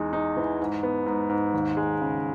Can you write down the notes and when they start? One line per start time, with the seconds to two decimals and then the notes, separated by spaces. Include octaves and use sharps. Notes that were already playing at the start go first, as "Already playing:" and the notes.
Already playing: E2 G#3 D#4
0.13 D#4
0.37 E3
0.60 G#2
0.83 B3
1.06 G#2
1.29 G#2
1.54 D#2
1.77 G#3
2.01 C#3